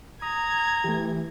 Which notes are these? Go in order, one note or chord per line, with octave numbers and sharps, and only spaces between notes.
A#5 D#6 G#6
E3 A3 G4